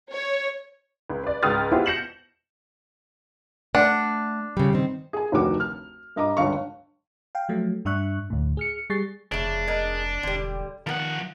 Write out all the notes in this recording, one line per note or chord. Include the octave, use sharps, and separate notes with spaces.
C#5
C#2
B4 D5
C#2 G#2 G5 D#6 F6 A6
B3 E4 F4 G4 G#4 C5
G6 A#6 C#7 E7 F#7
A3 D4 F#5
C#3 G3
D#3 C4
G#4 G#5
F1 D2 D#3 F#4 D6
F6
G2 D#5 A#5 D6
G1 C#2 D3 F5 C#6
F5 G5
F3 F#3 A3
G2 D4 E5 C#6 F#6
D2 A2
G#4 F6 C#7
G3 G#4 C#6 A6 C7
F1 C#3 A3 D4
G#3 A#4
E1 D3 G3
D#3 F3 B3 A#4 F#5